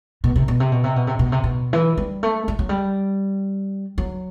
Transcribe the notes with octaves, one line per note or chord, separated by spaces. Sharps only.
B2
C3
B2
C3
B2
C3
B2
C3
B2
C3
B2
E3
G3
A3
G3
F#3
G3
F#3